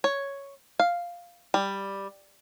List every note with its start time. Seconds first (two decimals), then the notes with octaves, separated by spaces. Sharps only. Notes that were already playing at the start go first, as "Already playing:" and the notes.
0.04 C#5
0.79 F5
1.54 G3